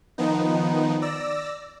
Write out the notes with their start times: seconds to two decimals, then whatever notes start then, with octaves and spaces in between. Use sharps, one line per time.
0.18 D#3 F3 B3 D#4
1.02 D5 E6 A#6